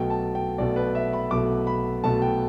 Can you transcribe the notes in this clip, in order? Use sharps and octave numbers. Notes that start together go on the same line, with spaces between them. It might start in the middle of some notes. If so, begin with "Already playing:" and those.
Already playing: B1 B2 A3 G5
A5
G5
B1 B2 A3 D5
B4
E5
B5
B1 B2 A3 D6
B5
B1 B2 A3 A5
G5